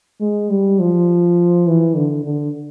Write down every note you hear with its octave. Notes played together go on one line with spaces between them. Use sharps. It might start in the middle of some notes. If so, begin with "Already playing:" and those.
G#3
G3
F3
E3
D3
D3